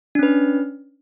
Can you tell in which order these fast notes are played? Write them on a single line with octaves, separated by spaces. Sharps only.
D4 C#4 B4